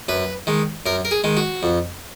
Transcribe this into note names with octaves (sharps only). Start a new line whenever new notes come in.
F#2 B4
D#3 G#3
F#2 A#4
A#4
G#4
D#3 G#3
F#4
F2